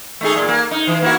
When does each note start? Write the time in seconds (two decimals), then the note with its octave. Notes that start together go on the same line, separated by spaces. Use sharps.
0.21 A3 D#4 G#4
0.36 A#2
0.49 A#3
0.71 D#4
0.87 E3
1.02 A#3 E4 F#4